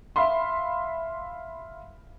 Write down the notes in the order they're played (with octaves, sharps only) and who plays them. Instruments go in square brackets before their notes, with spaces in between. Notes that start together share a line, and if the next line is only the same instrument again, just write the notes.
[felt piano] E5 F5 B5 C6